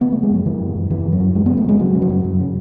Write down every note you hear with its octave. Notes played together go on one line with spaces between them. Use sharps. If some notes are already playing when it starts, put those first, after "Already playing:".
C#3 B3
A3
C#3
G#3
F#2 F#3
C#3 E3
F#2
F#2
F#2 E3
F#2
F#3
F#2
F#2 G#3
B3
C#3
A3
C#3 G#3
C#3 F#3
C#3
F#3
F#2
F#2
C#3